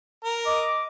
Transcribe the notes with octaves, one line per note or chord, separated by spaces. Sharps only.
A#4
D#5 D6